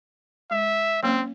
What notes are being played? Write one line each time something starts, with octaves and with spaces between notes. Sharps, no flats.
G#3 E5
F#3 A#3 C4 C#4